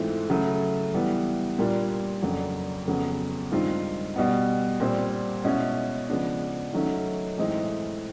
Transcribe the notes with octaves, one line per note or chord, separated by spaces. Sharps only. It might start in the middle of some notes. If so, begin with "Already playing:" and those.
Already playing: G#2 E3 A3 C4 F4
C#3 F#3 A3
E3 G3 B3
A#2 G3 A#3 D4 F4
F2 C#3 F#3 A#3 D4
F2 C#3 F#3 B3
G2 D#3 G#3 C4 F4
B2 G3 B3
A#2 G3 C4
B2 G#3 C#4 E4
C#3 F3 G#3 B3 D4
D#3 F#3 A3 C#4
A2 E3 G#3 C4 D#4